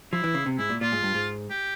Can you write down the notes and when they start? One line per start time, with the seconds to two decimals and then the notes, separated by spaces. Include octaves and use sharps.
0.12 F3 E4
0.24 E3
0.35 C#3
0.46 C3
0.58 G#2 E4
0.70 A#2
0.81 A#2 F4
0.92 G#2
1.03 G2
1.14 G#2
1.50 G4